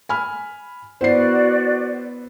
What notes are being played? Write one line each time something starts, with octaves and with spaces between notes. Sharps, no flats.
G#5 B5 F6
B3 E4 F#4 C5 D5 C7